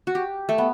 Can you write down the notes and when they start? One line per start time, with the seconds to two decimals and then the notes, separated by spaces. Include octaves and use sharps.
0.07 F#4
0.15 G4
0.49 A3
0.58 B3